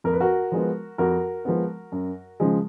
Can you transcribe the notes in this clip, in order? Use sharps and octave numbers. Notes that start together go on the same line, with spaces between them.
F2 A#4
B4
F#4 A#4
F3 G#3 B3
F2 F#4 A#4
F3 G#3 B3
F#2
C#3 F3 G#3